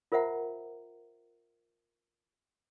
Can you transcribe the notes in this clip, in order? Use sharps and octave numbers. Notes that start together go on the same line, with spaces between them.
F4 A#4 C5 E5 F#5 A#5